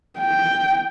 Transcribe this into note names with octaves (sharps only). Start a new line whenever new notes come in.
G5